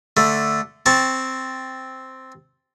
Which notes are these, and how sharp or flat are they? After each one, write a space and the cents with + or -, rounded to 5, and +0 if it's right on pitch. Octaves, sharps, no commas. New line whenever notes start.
D3 +0 A3 +0
C4 +0 A5 +0 C#6 +0